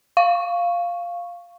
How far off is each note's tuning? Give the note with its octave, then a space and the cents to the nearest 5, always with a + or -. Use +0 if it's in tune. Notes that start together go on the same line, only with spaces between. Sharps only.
F5 +0 C#6 +0